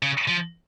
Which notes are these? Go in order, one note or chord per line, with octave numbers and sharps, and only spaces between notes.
C#3
F3